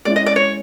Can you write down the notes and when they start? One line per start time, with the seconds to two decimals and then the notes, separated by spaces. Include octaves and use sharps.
0.05 G#3 C#4 E4 D5
0.16 D#5
0.26 D5
0.36 C#5